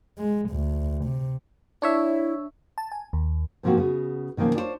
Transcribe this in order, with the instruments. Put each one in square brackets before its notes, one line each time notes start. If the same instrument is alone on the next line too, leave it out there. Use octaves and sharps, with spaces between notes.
[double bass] G#3
D2
C3
[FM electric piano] D4 C#5 E5 [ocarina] E4
[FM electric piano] A5
G#5
D#2
[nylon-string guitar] G#2 C3 F3 A#3 C4 F#4
C#3 B3 F#4
B2 D#3 F3 A#3 C#4
D4 E4 F4 G#4 C5 C#5